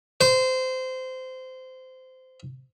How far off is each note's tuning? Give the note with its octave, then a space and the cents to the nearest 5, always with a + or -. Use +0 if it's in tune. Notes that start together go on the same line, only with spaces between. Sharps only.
C5 -20